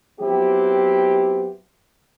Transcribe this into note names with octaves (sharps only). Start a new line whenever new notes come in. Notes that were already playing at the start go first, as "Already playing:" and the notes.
F#3 B3 C4 E4 G4